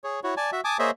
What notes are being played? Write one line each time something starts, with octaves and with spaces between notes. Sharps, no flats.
G#4 C#5
E4 F#4 C#5
D5 G#5 A5
F#4 E5
G#5 A5 D6 D#6
A#3 G#4 C5 C#5 D#5 E5